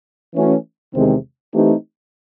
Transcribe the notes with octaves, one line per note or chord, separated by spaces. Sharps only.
E3 A3 C#4 F#4
E2 C3 D#3 G#3 C4
E3 A3 C4 D#4 G4